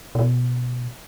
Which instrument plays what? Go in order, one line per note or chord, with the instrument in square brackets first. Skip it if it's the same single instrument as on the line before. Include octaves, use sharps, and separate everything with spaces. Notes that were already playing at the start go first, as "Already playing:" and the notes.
[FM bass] B2